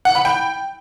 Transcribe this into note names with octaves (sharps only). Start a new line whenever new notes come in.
F#5
B5
G5